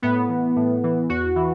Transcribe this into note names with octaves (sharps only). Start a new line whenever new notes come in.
A2 B3
E3
A2
E3
E2 F#4
E3